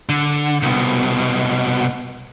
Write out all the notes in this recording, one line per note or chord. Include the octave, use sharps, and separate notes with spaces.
D3
C2 B2